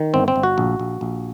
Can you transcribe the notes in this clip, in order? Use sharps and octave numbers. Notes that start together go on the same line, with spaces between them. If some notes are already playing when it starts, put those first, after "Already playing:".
Already playing: D#3
G1 C4
C4
G1
F#4
A#1
A#1
A#1